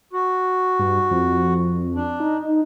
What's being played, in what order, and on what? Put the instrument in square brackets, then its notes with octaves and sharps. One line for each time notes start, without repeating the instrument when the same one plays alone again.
[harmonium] F#4
[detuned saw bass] G2
F2
[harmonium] D4
[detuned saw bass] D#4